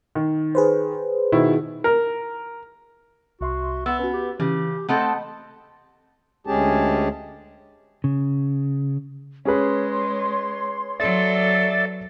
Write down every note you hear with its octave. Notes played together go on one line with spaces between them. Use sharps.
D#3
G#4 B4 C5
B2 D#3 E4
A#4
C2 F#4 E5 C6
B3 E6
C#4 F#4 B4
G4
C#3 E3 G4
A3 C4 A4 D#5 F#5 B5 D#6
D2 G#3 C#4 G4 G#4 A5
C#3
G#3 C#4 G#4 B4 C#5 C6
F#3 A4 D5 E5 A6